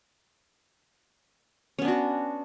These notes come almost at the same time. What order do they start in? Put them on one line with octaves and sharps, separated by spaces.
C#4 B3 D4 F#4